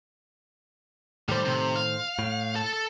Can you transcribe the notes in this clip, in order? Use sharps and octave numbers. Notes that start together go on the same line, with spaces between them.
A2 D#3 G3 G4 C5
C3
F5
A2
A4 A5